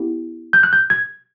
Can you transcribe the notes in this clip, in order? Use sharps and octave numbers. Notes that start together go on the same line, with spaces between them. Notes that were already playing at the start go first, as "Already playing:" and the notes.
Already playing: B3 E4 G4
G6
F#6
G6
G#6